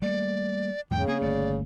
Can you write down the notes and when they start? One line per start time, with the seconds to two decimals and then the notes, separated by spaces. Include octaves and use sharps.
0.02 G3 A3 A#3 D5
0.91 E2 G#2 C#3 G5
1.08 A#3 C4 G#4
1.21 G1 A3 A#3 D5